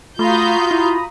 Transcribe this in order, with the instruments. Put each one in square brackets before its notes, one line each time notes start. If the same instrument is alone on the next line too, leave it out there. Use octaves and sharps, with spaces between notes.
[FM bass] A3 [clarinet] F4 [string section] F#4 F5 G6 [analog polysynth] A#5 B5 D#6
[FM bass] E4